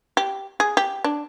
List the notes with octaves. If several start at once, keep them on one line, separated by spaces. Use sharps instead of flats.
G4
G#4
G4
D4